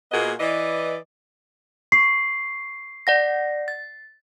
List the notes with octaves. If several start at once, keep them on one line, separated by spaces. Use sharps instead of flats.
A#2 A#3 B3 F#4 G#4 D#5
E3 D5 D#5
C#6 C7
D5 F#5 A#6
A6